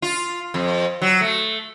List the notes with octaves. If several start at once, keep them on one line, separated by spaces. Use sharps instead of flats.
F4
F2
F#3
A3